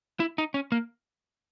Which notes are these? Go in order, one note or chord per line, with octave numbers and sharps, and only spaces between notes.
E4
D#4
C#4
A#3